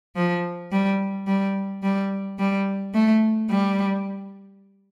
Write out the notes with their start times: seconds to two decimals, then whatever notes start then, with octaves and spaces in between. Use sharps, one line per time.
0.16 F3
0.72 G3
1.27 G3
1.83 G3
2.39 G3
2.94 A3
3.50 G3